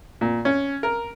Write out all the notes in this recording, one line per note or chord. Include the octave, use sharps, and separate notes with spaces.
A#2
C#4
A#4